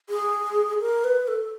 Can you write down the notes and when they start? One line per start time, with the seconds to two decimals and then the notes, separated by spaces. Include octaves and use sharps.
0.09 G#4
0.81 A#4
1.04 B4
1.28 A4